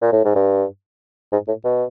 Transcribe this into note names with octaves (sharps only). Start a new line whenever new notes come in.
A#2
A2
G#2
G2
G#2
A2
B2